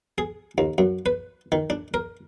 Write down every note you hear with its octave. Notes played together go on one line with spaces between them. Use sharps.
G#4
D#2
F#2
B4
D#3
D4
A#4